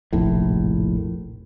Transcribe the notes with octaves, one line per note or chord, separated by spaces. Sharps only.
F1 A#1 A2